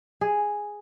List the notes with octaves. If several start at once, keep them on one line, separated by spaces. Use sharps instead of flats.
G#4